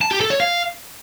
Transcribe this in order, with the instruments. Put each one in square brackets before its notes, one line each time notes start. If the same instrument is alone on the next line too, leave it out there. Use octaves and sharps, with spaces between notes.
[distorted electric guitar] A5
G4
A4
C#5
F5